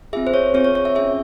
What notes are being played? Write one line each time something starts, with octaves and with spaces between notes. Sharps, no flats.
C4 F4 G#4 E5
C5
C#5
C4 F4 G#4 C#5
C#5
C#5
E5
C#4 F4 G#4 E5